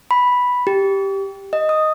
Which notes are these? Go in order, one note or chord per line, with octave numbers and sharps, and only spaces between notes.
B5
G4
D#5
D#6